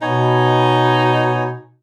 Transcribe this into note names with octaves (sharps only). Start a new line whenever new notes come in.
B2 B3 D#4 C#5 G#5